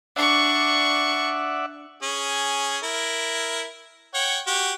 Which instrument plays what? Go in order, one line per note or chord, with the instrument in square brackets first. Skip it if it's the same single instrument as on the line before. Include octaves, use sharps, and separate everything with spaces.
[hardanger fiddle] D4 C#6 [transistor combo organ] D5 E5 F#5
[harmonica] C#4 G#4
E4 A#4
C#5 F#5 G5
F#4 G4